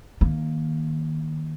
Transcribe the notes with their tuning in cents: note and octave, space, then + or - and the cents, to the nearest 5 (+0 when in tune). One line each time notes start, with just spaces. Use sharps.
D#3 +0 A#3 +0